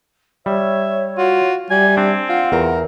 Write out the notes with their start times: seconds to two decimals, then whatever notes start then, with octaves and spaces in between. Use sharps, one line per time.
0.46 G3 C#5 E5
1.18 F4 F#4
1.70 G3 E5 G#5
1.97 C4 D4
2.29 F4 F#5
2.52 E2 A#4